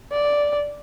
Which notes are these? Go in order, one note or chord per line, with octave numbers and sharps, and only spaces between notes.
D5